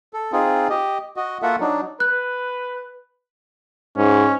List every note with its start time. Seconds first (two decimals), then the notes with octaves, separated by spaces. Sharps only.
0.13 A4
0.32 C4 D#4 F4 G#4
0.69 G4 D#5
1.17 F#4 D#5
1.42 A#3 F4 F#4 A4 E5 F#5
1.60 F#3 D4 D#4
2.00 B4 F#6
3.97 G#2 C#4